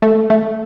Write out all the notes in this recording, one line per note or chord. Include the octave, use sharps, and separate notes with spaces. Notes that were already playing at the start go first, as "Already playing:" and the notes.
A3
A3